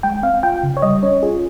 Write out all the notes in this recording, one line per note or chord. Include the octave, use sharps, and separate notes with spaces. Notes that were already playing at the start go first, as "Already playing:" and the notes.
G#3 G5
C4 F5
F4 G5
C#3
C#5
G3 D#5
C#4 C#5
F4 G#4